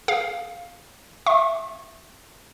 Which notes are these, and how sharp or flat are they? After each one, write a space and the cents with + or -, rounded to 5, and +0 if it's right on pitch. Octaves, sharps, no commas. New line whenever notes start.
G#4 -10 F5 +0
E5 +0 C#6 -40